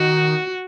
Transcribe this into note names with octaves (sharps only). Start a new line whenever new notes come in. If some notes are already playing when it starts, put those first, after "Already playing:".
Already playing: D#3 F#4